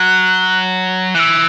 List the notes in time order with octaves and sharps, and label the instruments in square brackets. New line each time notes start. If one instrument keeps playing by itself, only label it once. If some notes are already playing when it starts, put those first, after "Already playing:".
Already playing: [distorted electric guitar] F#3 [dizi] F#6
[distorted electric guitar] E3 [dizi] F#6
[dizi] E6